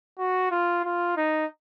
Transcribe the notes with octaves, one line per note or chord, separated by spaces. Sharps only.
F#4
F4
F4
D#4